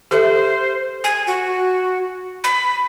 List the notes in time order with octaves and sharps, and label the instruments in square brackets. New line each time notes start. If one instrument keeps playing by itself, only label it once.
[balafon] G4 A4 E5 [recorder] C5
[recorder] G#5
F#4
B5